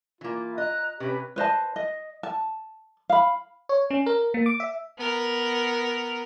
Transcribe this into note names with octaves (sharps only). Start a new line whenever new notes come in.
E3 A#3 F4
E4
D#5 A#5 F#6
C3 C#4 G4 B4
B4 C5 D#5 A5
D#5
A5
F5 B5
C#5
C#4
A#4
A#3
D6
E5
B3 A#4